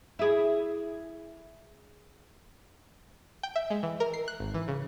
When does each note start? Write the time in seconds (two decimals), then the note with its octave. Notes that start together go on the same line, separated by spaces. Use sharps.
0.19 E4 G#4
3.43 G5
3.56 E5
3.70 G#3
3.83 E3
4.00 A#4
4.14 C7
4.28 F#6
4.40 G#1
4.54 E3
4.68 C#3